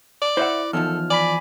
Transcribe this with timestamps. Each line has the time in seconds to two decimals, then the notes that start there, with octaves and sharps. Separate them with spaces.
0.22 D5
0.37 E4 C5 E5 F#5
0.73 E2 D#3 F3 A4 F6
1.10 D5 G#5 B5 B6